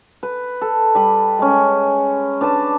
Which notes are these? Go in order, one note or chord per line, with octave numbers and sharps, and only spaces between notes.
B4
A4
G3 B4 B5
G#3 C#4
D4 B4 D5 A5